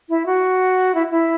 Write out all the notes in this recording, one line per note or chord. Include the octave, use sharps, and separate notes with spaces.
E4
F#4
E4
E4